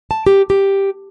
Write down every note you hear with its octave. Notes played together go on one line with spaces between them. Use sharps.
A5
G4
G4